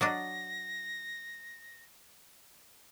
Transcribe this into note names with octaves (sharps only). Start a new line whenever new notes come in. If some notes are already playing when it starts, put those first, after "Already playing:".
F#3 D4 D#5 A#6